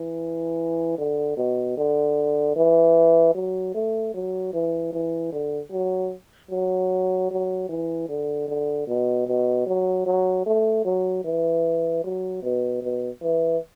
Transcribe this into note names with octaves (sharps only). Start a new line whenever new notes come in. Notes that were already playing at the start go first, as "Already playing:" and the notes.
Already playing: E3
D3
B2
D3
E3
F#3
A3
F#3
E3
E3
D3
F#3
F#3
F#3
E3
D3
D3
B2
B2
F#3
F#3
A3
F#3
E3
F#3
B2
B2
E3